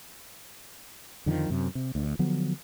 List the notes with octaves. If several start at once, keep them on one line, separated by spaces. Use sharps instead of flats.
F2 D3 D#3 F3
F#2 C3
C3
D2
D3 F3 F#3 B3